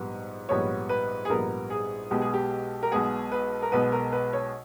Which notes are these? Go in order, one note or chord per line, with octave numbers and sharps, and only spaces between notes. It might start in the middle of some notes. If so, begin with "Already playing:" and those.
Already playing: A#1 G#2 G3 B3
A#1 G#2 G3 B3 C#5
B4
G#4
A#1 G#2 G3 B3 A#4
G#4
B1 B2 G#3 B3 G4
G#4
G4
A#4
B1 B2 G#3 B3 G#4
B4
A#4
B1 B2 G#3 B3 B4
A#4
B4
C#5